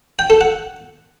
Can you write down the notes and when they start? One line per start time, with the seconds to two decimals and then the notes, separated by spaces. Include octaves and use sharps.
0.19 G5
0.30 A4
0.41 F#5